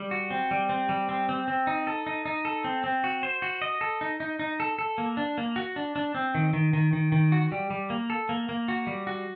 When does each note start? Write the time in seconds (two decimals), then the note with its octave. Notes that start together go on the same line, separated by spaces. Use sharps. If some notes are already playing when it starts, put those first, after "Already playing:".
Already playing: G3
0.11 F#4
0.30 C4
0.51 G3
0.69 C4
0.89 G3
1.09 C4
1.29 C4
1.48 C4
1.67 D#4
1.87 A4
2.06 D#4
2.26 D#4
2.45 A4
2.64 C4
2.84 C4
3.04 F#4
3.23 C5
3.42 F#4
3.62 D#5
3.81 A4
4.01 D#4
4.20 D#4
4.39 D#4
4.60 A4
4.79 A4
4.98 A#3
5.17 D4
5.38 A#3
5.56 F#4
5.76 D4
5.96 D4
6.15 C4
6.35 D#3
6.53 D#3
6.73 D#3
6.93 D#3
7.12 D#3
7.32 F#4
7.52 G3
7.70 G3
7.90 A#3
8.10 A4
8.29 A#3
8.49 A#3
8.68 F#4
8.87 G3
9.07 F#4